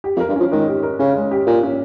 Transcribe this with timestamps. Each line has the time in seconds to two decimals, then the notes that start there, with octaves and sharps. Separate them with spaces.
0.04 G4
0.16 F2
0.20 A#4
0.29 G2
0.36 F3 C#4
0.51 D#3 G#3
0.68 G4
0.83 A#4
0.99 C#3 C#4
1.16 G#3
1.31 G4
1.47 A#2 A#4
1.63 C#4